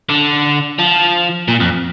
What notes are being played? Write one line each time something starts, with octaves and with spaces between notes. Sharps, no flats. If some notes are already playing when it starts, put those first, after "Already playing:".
D3
F3
A#2
F2